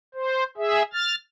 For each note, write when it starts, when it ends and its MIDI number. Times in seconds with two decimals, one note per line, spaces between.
0.14 0.44 72
0.57 0.82 68
0.57 0.82 76
0.93 1.15 89
0.93 1.15 93